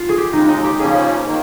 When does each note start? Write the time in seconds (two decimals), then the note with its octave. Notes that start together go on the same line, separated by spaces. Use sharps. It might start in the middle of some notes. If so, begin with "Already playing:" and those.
Already playing: F4
0.09 G#4
0.18 G4
0.32 D#2 C#3 G#3 D#4
0.49 D#4
0.64 G4
0.79 C#3 F3 A#3 C#4 G#4
1.26 D#3 A#3